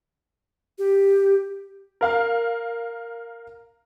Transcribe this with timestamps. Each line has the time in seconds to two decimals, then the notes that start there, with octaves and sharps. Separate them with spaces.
0.79 G4
2.01 A#4 F5 F6